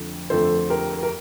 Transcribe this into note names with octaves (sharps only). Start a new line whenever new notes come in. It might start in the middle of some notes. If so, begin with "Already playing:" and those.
Already playing: F2 D3 F3 A3
F2 D3 F3 A3 A4 C5
G4 A#4
A#4